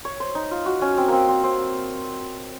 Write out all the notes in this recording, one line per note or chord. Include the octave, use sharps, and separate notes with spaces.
C#5
C5
D#4
F4
F#4
C#4
C4
A#3 C4
C4
C4